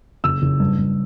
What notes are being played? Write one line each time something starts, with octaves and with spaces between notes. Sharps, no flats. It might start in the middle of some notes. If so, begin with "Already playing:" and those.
F#1 E6
F#1
G2
G2